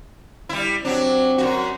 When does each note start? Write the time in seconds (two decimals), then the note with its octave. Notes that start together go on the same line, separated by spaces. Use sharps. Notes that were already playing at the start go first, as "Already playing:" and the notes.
0.49 G3 E4
0.85 F#3 C4 D4
1.38 F#2 A2 F#4